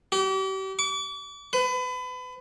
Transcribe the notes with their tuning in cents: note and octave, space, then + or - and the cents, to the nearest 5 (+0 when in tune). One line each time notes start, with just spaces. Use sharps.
G4 -40
D6 -40
B4 +30